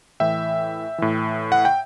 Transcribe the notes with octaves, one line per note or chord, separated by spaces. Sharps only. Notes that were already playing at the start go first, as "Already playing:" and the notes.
A2 E3 E5 G5
A2 E3
F#5
G5